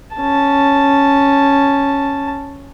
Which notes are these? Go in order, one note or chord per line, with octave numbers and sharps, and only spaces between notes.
C#4 A5